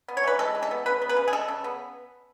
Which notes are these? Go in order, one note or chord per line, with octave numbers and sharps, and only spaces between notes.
B3
C#5
E3 B4
G#3 A4
E3
A4
B3
C#3 B4
B3
B4
C#3
G#4
G#3 A4
C#3
B3